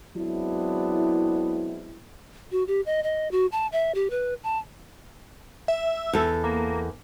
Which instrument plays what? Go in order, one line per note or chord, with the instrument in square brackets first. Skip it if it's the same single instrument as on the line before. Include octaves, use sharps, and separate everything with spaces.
[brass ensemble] F#3 G#3 B3 C4 D4 E4
[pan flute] F#4
G4
D#5
D#5
F#4
A5
E5
G4
B4
A5
[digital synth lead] E5
[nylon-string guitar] E2 A4
[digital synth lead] A#3